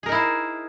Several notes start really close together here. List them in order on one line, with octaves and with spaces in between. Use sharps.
G#4 A#4 D#4 E4 C5